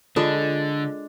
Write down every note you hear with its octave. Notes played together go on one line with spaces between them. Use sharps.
D3 G#3 D4 F4 A4